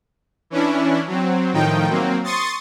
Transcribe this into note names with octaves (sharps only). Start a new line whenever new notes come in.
E3 C#4 D4 E4
F#3 C4
A2 D#3 F3 D#4 G5
F#3 A#3 C4
C6 C#6 D#6 A6